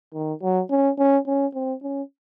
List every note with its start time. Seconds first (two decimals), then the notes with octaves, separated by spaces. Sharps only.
0.14 D#3
0.42 F#3
0.71 C#4
0.99 C#4
1.27 C#4
1.55 C4
1.83 C#4